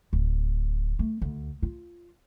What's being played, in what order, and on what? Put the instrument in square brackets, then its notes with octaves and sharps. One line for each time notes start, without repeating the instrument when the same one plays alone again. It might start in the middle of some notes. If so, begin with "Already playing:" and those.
[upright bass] D1
A3
D2
F4